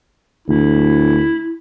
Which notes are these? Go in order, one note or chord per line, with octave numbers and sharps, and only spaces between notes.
D2 E4